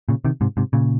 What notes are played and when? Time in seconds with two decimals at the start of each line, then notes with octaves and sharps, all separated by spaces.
0.09 A#2 C#3
0.25 C3 D#3
0.41 G#2 C3
0.57 G#2 C3
0.73 A#2 C#3